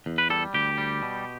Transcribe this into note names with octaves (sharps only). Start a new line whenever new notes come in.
E2
B4
G3 A4
D2 G4
G3
B2